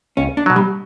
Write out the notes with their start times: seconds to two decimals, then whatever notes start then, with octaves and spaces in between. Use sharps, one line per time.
0.17 C#2 C#4
0.37 D4
0.46 B2 F#3
0.56 G3